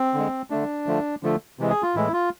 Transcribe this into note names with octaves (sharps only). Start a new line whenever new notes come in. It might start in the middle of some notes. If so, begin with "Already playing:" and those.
Already playing: C4
D3 G#3
D3 A3 D4
D3 F3 A3
D3 F3 A3
C3 E3 G#3
G#4
F4
A2 E3 G#3 E4
F4